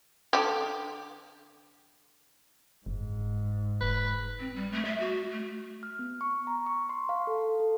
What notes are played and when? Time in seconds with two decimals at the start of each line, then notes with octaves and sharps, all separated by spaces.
0.33 D3 G4
2.86 F#1 G#2
3.81 F1 B4
4.40 C4
4.56 G3
4.72 A3
4.85 E5
5.00 F#4
5.31 A3
5.83 F6
5.99 B3
6.21 C#6
6.47 A#5
6.66 C#6
6.89 C6
7.09 F5
7.27 A4
7.60 A4